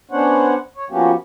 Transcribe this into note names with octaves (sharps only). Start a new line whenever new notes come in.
B3 C#4 D4 C5 C#5 F#5
C#5
F3 A#3 B3 C#4 F#4 G4